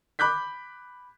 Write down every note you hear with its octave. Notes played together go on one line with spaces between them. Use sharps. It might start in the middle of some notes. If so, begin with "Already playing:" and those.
B5 D6 F#6 G6 B6